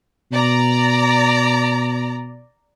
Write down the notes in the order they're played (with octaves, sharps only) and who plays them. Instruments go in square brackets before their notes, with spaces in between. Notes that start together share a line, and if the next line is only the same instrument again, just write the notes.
[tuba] B2 [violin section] D5 A#5